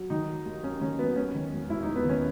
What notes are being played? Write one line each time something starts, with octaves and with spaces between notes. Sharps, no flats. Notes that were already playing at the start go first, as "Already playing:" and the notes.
Already playing: F#3
D#3 D#4
F#3
D#2
D#2 C#4
D#3 C#4
F#3 B3
D#2 C#4
D#3
E1
E1 E4
D#4
D#2
B3
D#3 C#4